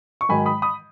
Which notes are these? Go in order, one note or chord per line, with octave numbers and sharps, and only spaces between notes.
C#6
G#2 D#3 F#3 G#5 B5
B5 D#6
B5 D#6